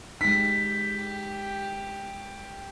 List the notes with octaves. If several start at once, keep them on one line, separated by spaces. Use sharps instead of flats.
G#3 D#4 G4 B6